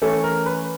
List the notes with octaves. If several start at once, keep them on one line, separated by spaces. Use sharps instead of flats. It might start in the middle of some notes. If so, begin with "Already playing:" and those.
E3 A3 C#4 A4
A#4
B4